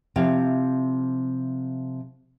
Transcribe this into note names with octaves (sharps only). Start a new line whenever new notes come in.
C3 F3 E4 F5